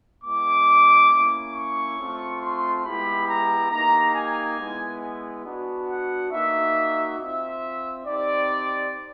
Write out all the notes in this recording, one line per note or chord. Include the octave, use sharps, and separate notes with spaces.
G#3 B3 E4 D6
A#3 C#4 E4
C#6
A3 C4 F4
C6
G#3 B3 E4 G4 B5
A#5
A#3 D#4 G4 A#5
G#5
G#3 B3 E4
B3 D4 F#4
F#5
A#3 D#4 F#4 E5
C4 F4 E5
C4 D#4 G4 D5